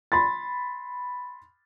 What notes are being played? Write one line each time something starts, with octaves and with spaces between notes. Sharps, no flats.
B5 C6 A6